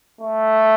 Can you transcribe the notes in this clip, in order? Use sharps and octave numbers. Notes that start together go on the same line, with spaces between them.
A3